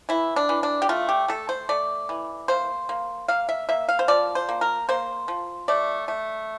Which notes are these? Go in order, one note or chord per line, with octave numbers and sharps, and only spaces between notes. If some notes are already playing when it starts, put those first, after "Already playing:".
E3 E4
D4
E3
D4
G4
A3 F4
G4
A3 A4
C5
A3 D5
E3
A#3 C5
A#3
A#3 F5
E5
A#3 E5
F5
C5
F3 D5
C5
A#3
A#4
A#3 C5
F3
A3 D5
A3